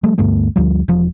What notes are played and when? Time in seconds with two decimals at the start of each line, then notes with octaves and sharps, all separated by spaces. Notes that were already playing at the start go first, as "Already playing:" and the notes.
0.03 F3 G3 A3
0.18 D2 G2 A3 B3
0.56 D2 F3 G3
0.88 E1 F3